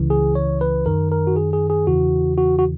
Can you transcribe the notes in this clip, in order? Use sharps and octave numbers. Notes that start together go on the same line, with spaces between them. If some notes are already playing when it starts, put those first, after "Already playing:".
Already playing: C#2 C#3 E3
G#4
C#5
B4
F#2 D#3 A#4
A#4
F#4
G#4
G#4
G#4
E2 C#3 E3 F#4
F#4
F#4